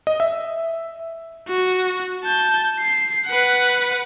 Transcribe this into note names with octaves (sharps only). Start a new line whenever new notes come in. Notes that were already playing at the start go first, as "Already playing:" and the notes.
D#5
E5
F#4
A5 G6
C7
B4 F#5